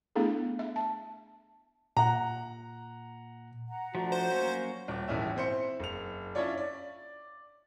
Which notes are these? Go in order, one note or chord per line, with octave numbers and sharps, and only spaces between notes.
A3 B3 D4 E4 G#4 A4
E5
A5
A#2 F#5 A#5
F#5 A#5
F3 A3 D4 F#4
C5
F#3 A#3 C#4
D#1
D#1 G#1 E3 C#4 E5
C4 E4 C5 C6 C#7
F#1 F7
C#4 D4 E4 F4 C#5 D5
D5